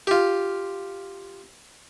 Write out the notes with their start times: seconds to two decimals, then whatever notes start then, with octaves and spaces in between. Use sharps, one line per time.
0.07 F4 G4